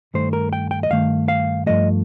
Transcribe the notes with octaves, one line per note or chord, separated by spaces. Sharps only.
G2 D#3 A3 C5
A#4
G5
G5
D#5
G2 D#3 A3 F5
F5
G2 F3 A3 D#5